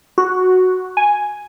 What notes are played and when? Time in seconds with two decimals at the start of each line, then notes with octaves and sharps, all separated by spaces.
0.18 F#4
0.97 G#5